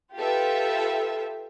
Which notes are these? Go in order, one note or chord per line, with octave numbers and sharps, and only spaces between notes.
F4 G4 A4 B4 E5